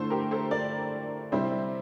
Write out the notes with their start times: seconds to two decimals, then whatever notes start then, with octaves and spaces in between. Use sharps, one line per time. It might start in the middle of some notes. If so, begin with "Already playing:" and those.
Already playing: D3 A3 E4 A4 C5
0.10 G4 A#4
0.31 A4 C5
0.51 A#4 D5
1.32 C3 G3 C4 E4 C5 E5